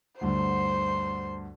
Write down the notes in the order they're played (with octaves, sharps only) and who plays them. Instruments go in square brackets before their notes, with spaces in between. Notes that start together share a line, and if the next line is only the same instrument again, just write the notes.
[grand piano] D2 G2 D3 [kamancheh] C5 C6